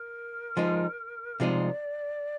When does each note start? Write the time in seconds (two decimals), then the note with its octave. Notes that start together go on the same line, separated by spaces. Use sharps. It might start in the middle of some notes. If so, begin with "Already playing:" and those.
Already playing: A#4
0.57 F3 G#3 D#4
1.39 C3 F3 G#3 D#4 D5